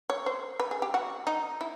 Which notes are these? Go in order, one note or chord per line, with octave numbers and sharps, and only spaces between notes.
C#5
C5
B4
G#4
G4
F#4
D#4
E4